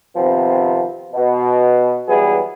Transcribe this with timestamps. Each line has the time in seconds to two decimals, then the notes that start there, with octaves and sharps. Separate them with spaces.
0.16 C3 D#3 F3 B3 C4
1.13 B2
2.08 E3 F#3 G3 B3 E4 G#4